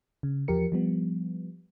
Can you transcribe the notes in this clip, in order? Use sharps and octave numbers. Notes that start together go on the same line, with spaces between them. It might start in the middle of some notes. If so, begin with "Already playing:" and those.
C#3
E2 F3 G4 A#4 C#7
F3 G3 B3